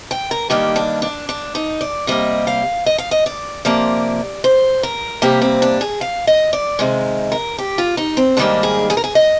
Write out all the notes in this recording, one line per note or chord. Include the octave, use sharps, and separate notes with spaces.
G5
A#4
G2 D#3 A#3 G4
D4
D4
D4
D#4
D5
C3 G3 A#3 D#5
F5
D#5
F5
D#5
D5
C3 F3 A#3 D5
C5
A#4
C3 G3 A#3 G4
C4
D4
G#4
F5
D#5
D5
C3 D#3 G#3
A#4
G4
F4
D#4
C4
G#2 D#3 G3 A#3 D4
G#4
G#4
A#4
G#4
D#5